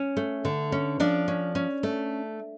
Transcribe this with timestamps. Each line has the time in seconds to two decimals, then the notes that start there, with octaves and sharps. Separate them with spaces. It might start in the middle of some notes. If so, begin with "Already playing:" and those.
Already playing: C#4
0.17 A3
0.45 D3
0.72 C#4
1.00 F3 D4
1.28 C#4
1.55 C#4
1.83 A3